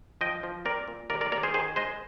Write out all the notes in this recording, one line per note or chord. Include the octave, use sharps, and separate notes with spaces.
F3 D#5 G5
F3
C4 A#4 D5
A#2
D#2 A#4 D5
A#4 D5
D#2 A#4 D5
G#4 C5
D#3 G#4 C5
G#3 C5 D#5